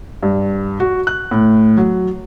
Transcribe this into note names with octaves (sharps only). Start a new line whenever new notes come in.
G2
F#4
F#6
A2
F#3